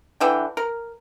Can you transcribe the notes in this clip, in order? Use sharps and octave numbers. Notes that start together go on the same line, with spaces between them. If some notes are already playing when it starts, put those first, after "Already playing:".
D3 E3 G5
A#4